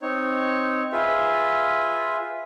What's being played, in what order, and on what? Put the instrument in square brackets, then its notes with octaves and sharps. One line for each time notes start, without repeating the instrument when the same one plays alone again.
[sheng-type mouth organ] C4 D#4 C#5
F4 G#4 B4 E5